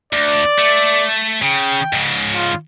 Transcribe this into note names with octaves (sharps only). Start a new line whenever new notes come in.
D2 D5
A3
C#3 G5
G#2 C#3
F4